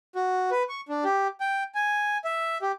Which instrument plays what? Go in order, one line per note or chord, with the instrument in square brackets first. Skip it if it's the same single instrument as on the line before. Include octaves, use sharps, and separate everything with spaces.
[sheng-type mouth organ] F#4
B4
C#6
D4
G4
G5
G#5
E5
G4